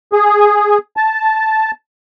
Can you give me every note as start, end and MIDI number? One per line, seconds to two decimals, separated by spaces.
0.13 0.78 68
0.97 1.71 81